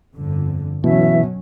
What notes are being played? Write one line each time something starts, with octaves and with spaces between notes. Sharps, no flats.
G1 F2 D3
B2 E3 F#3 C#4 E5